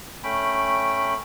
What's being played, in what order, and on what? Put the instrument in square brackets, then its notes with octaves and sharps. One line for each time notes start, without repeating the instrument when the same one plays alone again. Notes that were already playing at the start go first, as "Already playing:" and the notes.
[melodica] A3 C#4 G5 B5